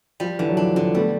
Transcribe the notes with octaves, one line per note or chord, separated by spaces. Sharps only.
F3 G3
D3 E3
F#3
F3 D4
D3 F3
G3 A3 B3